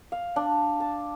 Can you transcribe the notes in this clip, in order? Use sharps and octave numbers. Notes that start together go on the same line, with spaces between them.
F5
D4
A5